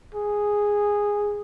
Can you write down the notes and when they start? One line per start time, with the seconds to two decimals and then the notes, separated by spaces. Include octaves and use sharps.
0.14 G#4